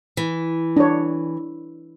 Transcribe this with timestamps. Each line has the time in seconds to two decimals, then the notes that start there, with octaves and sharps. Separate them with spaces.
0.17 E3
0.77 D4 C#5